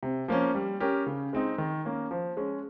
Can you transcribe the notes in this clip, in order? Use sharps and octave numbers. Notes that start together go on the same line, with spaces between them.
C3
F3 A#3 C#4
G3
C#4 G4 A#4
C#3
G#3 C4 D#4
D#3
A#3 C#4
F3
G#3 C#4